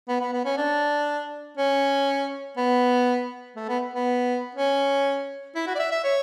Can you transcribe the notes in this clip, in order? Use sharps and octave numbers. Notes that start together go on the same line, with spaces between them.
B3
B3
B3
C#4
D4
C#4
B3
A3
B3
B3
C#4
E4
F#4
D5
E5
E5
C#5